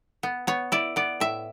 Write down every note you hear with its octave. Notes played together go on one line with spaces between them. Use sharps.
B3
B3 C#5
E4 D5
B3 D5
A2 E5